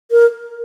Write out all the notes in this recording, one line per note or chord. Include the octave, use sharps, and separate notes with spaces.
A#4